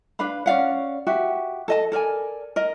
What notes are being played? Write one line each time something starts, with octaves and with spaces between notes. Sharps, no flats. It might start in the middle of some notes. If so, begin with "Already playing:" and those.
D4 B4 F5 B5
C#4 D5 F5 F#5
F#4 G4 E5
A4 D#5 A5
A4 A#4 D5 G#5
A#4 D#5